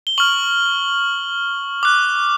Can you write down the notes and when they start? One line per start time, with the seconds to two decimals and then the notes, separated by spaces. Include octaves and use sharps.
0.07 G7
0.18 C#6 F6 F#7
1.83 D6 F#6